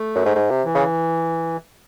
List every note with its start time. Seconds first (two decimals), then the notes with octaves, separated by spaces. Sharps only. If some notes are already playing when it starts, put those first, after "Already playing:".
Already playing: A3
0.15 F#2
0.25 G#2
0.35 G#2
0.50 C3
0.64 E3
0.75 C#3